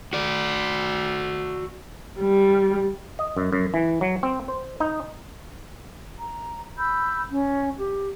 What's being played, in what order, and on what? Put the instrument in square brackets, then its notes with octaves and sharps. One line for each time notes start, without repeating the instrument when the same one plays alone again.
[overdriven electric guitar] F#4 D5
[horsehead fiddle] G3
[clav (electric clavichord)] D#5
F#2
F#2
E3
F#3
C4
C5
D#4
[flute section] A#5
B5 E6 G6
C#4
G4